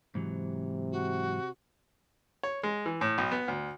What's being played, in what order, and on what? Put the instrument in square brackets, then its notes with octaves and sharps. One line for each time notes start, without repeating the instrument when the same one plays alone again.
[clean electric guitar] G#2 E3 F#3 [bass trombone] C3
[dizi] F#4
[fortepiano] C#5
G#3
E3
A2
B1
B3
D2